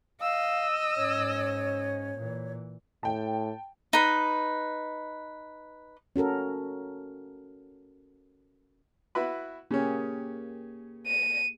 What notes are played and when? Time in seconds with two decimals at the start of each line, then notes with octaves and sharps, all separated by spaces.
0.21 D#5 F5 E6
0.95 G#2 C#4 C#5
2.17 A#2 E3
3.03 A2 G5 A5
3.93 D#4 B4
6.16 C#4 F#4 A4 A#4
9.15 E4 F#4 B4
9.71 C#3 A#3 C#4 G4 G#4
11.07 D#7